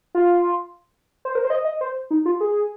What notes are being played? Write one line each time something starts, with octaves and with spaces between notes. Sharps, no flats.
F4
C5
A#4
C5
D#5
D#5
C5
D#4
F4
G#4